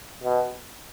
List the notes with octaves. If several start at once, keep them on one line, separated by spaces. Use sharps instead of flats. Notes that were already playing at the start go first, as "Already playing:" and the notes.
B2